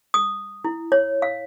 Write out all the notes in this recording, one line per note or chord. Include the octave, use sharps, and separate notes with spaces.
D#6
E4
C#5
F5